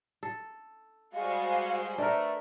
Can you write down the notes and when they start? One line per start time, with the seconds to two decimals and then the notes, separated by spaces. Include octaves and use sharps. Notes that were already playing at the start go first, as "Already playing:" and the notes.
0.23 A4
1.13 G3 G#3 F#4 C5 F5 G#5
1.98 A3 D4 A#4 B4 E5